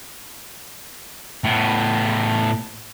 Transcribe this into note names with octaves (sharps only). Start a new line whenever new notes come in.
A2 B3